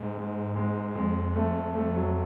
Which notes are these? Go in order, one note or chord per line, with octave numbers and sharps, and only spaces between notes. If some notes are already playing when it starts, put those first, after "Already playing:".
Already playing: G#2
G#3
G#3
F2 G#3
A3
A3
F#3